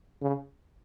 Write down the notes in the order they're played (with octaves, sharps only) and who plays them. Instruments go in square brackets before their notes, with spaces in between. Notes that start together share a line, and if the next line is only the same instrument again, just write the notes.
[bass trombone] C#3